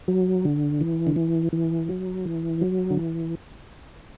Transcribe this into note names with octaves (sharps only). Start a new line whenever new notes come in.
F#3
D3
E3
D3
E3
E3
F#3
E3
F#3
D3
E3